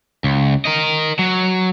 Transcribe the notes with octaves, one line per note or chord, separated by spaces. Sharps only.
C#2
A#4 D#5
F#3